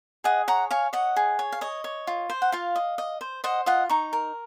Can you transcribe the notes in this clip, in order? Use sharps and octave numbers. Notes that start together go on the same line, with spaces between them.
G#4 D#5 F#5
C#5 F#5 A#5
C#5 F5 G#5
C#5 D#5 F#5
G#4
C#5
F5
C#5 D#5
C#5
F4
C5
F#5
F4 F5
D#5
D#5
C5
C5 D#5 F#5
F4 D#5 F#5
D#4 A#5 C#6
A#4